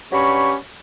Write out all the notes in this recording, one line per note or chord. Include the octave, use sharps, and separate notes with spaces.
G2 F#3 C#4 G4 B5 C#6